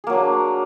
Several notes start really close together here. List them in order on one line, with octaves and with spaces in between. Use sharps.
G#4 A#3 F#3 D4